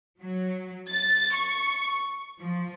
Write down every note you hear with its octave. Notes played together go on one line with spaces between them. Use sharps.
F#3
A6
C#6
F3